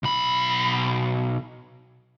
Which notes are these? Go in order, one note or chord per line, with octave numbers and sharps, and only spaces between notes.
B1 B5